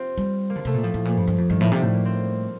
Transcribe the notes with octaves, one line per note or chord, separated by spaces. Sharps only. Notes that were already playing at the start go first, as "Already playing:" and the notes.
Already playing: C4 F4 G4
G3
A#3
D3
C3 A3
A#2
A2 F3
A2
A#2
G2
G2
F2
G2 D#3
A2 F3
C3 G3
A2 A3
A#3
C4